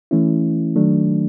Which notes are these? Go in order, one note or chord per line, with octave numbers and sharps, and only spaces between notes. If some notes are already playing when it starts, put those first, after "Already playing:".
E3 A3 C#4 E4
D#3 F#3 A3 D4